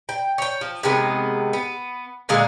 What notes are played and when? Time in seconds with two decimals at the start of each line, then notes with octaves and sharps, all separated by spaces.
0.09 G5
0.38 C#5 G5
0.61 F3
0.83 C3 D#3 G#3 B3
1.53 B3
2.29 A#2 D3 G#3 A#3